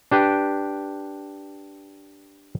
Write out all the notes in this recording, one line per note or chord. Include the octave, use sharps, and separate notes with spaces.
D4 G4 B4